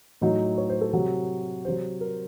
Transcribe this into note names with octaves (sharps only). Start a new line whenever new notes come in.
A2 F#3 D#4
C#5
C5
A4
C3 F#3 F#4
C3 F#3 C5
A#4